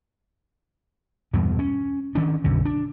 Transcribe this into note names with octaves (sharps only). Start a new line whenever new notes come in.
E2 G2 B2
C#4
D#3 C#4 D4
B1 F#2 D3
D4